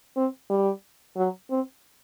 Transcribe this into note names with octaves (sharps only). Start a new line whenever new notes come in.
C4
G3
F#3
C4